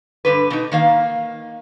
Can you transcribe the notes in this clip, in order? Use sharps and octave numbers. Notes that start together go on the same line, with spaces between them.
G2 D3 B4
B2 D#4
D#3 A#3 F5